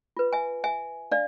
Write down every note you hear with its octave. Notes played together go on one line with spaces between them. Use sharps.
F4 B4
E5 G#5
E5 G#5
D4 D5 F5